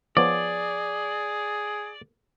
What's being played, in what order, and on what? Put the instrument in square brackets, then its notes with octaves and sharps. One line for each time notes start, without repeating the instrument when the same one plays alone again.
[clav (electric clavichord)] F3 B3 C#5 [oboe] G#4 [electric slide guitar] D5